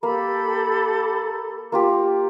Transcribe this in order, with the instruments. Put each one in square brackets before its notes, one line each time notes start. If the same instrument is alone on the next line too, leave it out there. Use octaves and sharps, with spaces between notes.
[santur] A#3 [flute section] G4 A4 B5
[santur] A#3 F4 G4